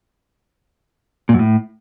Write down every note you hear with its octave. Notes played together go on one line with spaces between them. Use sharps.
A#2
F#2
A2